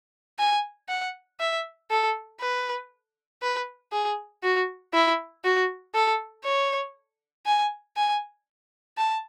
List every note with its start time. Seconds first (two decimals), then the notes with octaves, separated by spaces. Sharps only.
0.39 G#5
0.89 F#5
1.40 E5
1.91 A4
2.41 B4
3.42 B4
3.92 G#4
4.43 F#4
4.94 E4
5.44 F#4
5.95 A4
6.45 C#5
7.46 G#5
7.97 G#5
8.98 A5